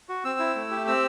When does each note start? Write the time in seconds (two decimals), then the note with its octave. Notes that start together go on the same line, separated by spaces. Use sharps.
0.09 F#4
0.25 C4 E6
0.39 E4
0.55 A3
0.71 G4
0.87 C4 E6